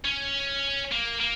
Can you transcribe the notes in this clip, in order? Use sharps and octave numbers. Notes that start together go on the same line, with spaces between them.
C#4
A#3
A#3